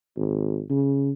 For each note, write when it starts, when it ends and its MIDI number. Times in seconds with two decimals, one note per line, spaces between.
0.16 0.61 32
0.70 1.10 49